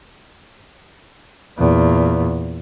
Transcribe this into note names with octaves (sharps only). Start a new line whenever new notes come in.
E2 A#2